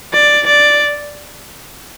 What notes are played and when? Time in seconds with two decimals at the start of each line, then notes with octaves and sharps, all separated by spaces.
0.14 D5
0.46 D5